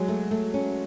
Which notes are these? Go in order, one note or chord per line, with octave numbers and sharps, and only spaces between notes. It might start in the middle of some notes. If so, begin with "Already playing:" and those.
Already playing: F#3 G#3
A3
A3
C#4